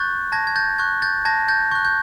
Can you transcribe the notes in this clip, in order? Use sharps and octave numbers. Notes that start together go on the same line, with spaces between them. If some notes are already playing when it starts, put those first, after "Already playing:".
Already playing: C#6 F#6 G6 A6
A5 G#6 A#6
G#6
G6 A6
C#6 F#6 G#6
G6 A6
A5 G#6 A#6
G6 A6
C#6 F#6 G6
G6